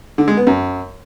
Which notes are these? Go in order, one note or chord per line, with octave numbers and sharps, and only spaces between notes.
D3
G#3
B3
F#2